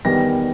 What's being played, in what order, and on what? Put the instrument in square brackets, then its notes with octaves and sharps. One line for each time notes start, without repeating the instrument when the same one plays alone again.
[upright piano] E2 D#3 G3 B3 A#6